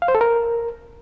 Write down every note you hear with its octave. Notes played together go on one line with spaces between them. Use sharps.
F5
C5
A4
A#4